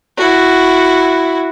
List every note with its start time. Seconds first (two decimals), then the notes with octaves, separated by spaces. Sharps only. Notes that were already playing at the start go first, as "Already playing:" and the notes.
0.17 E4 F#4